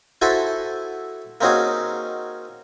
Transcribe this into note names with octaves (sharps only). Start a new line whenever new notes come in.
E4 F#4 A4 C5 G#5 A5
A#3 C4 C#4 D#4 F#4 G#4